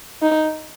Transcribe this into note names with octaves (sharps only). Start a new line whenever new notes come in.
D#4